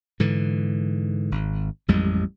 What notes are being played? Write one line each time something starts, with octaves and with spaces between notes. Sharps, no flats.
G#2 D3 E3
G#1
A1 F2 G3 G#3